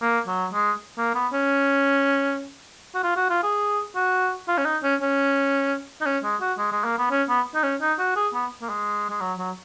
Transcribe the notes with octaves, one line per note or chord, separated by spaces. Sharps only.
A#3
F#3
G#3
A#3
B3
C#4
F#4
F4
F#4
F4
G#4
F#4
F4
C#4
D#4
C#4
C#4
D#4
C#4
G#3
F#4
G#3
G#3
A#3
B3
C#4
B3
D#4
C#4
D#4
F#4
G#4
B3
A#3
G#3
G#3
F#3
F#3